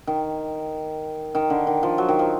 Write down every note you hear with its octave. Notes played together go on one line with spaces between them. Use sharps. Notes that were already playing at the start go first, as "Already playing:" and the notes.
D#3
D#3
D3
D#3
F3
F#3
D#3
F3